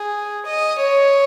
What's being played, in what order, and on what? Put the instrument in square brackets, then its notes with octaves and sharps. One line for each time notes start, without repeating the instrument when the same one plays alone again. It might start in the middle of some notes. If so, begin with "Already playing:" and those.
Already playing: [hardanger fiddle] G#4
D#5
C#5